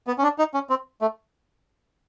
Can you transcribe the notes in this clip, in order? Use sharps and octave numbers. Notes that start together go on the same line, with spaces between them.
B3
C#4
D4
D#4
C#4
C4
A3